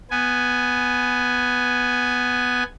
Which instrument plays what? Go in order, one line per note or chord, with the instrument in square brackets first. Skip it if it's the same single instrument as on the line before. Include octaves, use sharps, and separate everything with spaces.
[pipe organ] B3 G#5